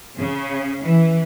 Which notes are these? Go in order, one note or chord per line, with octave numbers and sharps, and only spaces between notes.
C#3
E3